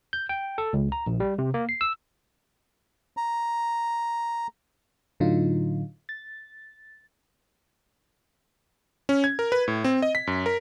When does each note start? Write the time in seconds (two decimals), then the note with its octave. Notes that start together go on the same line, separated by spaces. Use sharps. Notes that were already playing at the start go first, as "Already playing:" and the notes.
0.13 G6
0.29 G5
0.58 A4
0.73 C#2
0.92 A#5
1.07 A#1
1.20 G3
1.39 C3
1.54 A#3
1.69 C7
1.81 E6
3.17 A#5
5.20 A2 D3 F#3 D#4 F4
6.09 A6
9.09 C#4
9.24 G#6
9.39 A#4
9.52 B4
9.68 A2
9.84 C4
10.02 D#5
10.15 B6
10.27 F#2
10.46 A#4